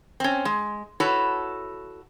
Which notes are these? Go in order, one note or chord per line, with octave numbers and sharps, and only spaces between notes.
C4 C#4
G#3
E4 F#4 A4 B4 C#5